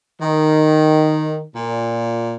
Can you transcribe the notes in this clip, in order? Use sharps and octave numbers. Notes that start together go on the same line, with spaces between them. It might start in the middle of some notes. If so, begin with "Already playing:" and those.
D#3
A#2